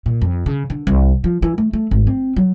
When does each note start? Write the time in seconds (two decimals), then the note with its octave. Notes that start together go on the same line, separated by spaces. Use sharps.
0.06 A#2
0.22 F2
0.46 C#3
0.70 D3
0.87 C2
1.24 F3
1.42 E3
1.58 A3
1.73 A3
1.91 G#1
2.07 C4
2.36 F#3